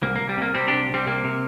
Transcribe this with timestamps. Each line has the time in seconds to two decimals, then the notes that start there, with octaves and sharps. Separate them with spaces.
0.03 C2 A#3
0.16 C2 A#3
0.29 G3
0.37 C3 A#3
0.55 C3 G3 C4
0.68 C2 D4 G4
0.89 C2 G3 C4
1.06 C3 A#3
1.24 C3